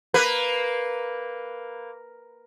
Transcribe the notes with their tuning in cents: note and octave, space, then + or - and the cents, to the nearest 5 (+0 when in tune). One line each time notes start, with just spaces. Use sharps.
A#3 +0 B4 +0